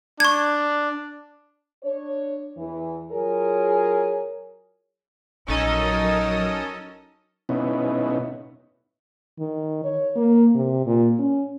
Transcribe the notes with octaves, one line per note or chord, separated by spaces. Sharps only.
D4 C#6 G#6
D4 C#5
E2 E3
F#3 F4 G#4 A#4 C#5
A#1 F#3 C#4 D#4 A4 A#4 D#5 D#6
B2 B3 C#4 D#4 E4
D#3
C#5
A#3
C3
A#2
C#4